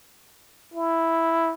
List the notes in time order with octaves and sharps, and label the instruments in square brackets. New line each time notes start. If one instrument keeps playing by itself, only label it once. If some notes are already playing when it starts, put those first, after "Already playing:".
[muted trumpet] E4